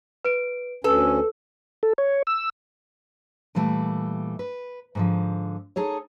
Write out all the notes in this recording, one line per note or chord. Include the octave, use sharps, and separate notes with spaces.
B4 D7
D2 C#4 A4 B4
A4
C#5
E6
A#2 E3 G3 A3 G4
B4
G#2 D3 F3
D#4 G#4 A4 C#5